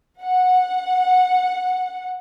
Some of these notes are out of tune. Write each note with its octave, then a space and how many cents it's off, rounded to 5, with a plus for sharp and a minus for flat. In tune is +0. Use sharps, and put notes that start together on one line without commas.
F#5 -15